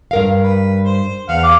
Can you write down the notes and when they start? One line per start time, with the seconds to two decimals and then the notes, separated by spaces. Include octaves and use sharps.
0.11 G2 A#4 F5
0.44 B4
0.85 C5
1.29 E2 F5 F#5
1.43 F5 D6